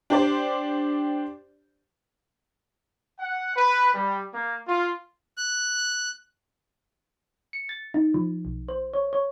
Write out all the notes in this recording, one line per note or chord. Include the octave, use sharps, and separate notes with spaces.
D4 G4 C5 D5
F#5
B4
G3
A#3
F4
F#6
C#7
A6
D#4
F3
B1
C5
C#5
C#5